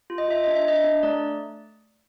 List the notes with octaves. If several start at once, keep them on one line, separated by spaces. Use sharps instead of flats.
F4
D#5
F4 E5
D4 D#5
E5
D4 D#5
D4
A3 D5